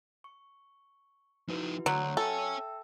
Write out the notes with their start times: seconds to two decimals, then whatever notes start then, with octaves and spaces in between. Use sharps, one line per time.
0.24 C#6
1.49 F3 D#4 E4 F#4 B4
1.86 D2 F#3 C6 G6
2.17 A4 C#5 E5 G5 G#5 E6